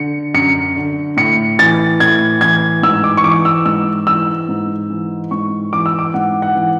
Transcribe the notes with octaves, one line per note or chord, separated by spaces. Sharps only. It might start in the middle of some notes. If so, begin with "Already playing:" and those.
Already playing: D3 C#7
F#2 C#7
D3
A2 C#7
E3 A6
A2 G#6
E3 G#6
G#2 E6
D6
C#6
E3 D6
E6
G#2 E6
E3 E6
G#2
E3
G#2 C#6
E3 D6
E6
D6
G#2 F#5
F#5
E3